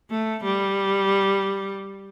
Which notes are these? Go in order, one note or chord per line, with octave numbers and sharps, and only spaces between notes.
A3
G3